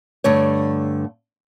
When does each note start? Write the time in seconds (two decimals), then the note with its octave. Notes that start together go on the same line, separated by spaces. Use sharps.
0.24 G2 D3 A3 C#5